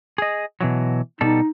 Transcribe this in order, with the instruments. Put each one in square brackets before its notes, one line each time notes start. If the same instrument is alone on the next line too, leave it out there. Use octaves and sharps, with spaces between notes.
[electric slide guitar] G#4 D#5
B2 E3 F#3
[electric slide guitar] B2 G3 A4 [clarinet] D#4